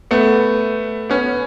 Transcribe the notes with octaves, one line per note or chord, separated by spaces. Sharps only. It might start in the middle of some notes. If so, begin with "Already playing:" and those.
A3 B3
B3 C#4